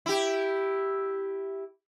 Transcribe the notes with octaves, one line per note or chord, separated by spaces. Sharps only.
E4 G4